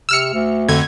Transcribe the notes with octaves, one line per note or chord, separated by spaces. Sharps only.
C3 E6 F6 C#7
D2
F2 D3 G#6